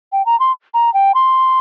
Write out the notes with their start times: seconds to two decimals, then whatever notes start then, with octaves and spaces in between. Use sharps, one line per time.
0.12 G5
0.26 A#5
0.40 C6
0.74 A#5
0.94 G5
1.15 C6